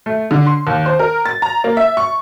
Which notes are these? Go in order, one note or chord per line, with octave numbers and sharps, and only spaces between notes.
A3
D3
C6
D#2
C5
A#4
A6
A#5
A#3
E5
C#6